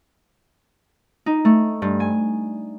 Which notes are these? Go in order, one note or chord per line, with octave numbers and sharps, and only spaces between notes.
D#4
A3
G2
G#5